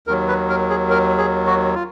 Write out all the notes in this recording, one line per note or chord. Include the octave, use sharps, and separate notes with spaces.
D#2 D#3 F#3 A#4
B4
A#4
G#4
A#4
G#4
F#4
F4